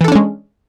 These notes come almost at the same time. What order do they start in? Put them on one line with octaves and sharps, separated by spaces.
E3 A4 D4 C#4 G#3